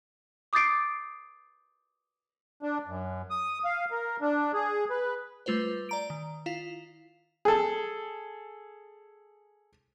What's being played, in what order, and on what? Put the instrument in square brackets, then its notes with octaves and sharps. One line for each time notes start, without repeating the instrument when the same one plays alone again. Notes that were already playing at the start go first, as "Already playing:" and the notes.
[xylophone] D6 D#6 G6 A6 C7 D7
[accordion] D4
F#2
D#6
F5
A#4
D4
G#4
B4
[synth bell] G3 A3 F4 B4 C5
D5 A#5 D7
D#3
E4 F4 F5
[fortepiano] G#4 A4